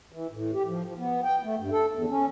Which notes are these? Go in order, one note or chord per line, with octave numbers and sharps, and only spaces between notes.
E3
A2
G4
F3
F3
B3
G5
A3
G2
A4
E2
C#4